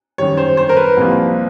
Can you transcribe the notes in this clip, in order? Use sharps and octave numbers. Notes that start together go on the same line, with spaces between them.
F#2 D#3 G3 C#5
C5
C5
A#4
B4
C2 C3 F3 A#3